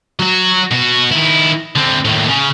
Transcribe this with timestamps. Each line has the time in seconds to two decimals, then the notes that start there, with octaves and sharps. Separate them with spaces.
0.20 F#3 F#4
0.71 B2 F#4
1.11 D#3 E4
1.76 D3 C4
2.05 D#2 A2
2.29 C#3